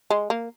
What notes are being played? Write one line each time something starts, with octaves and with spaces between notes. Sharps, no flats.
G#3
A#3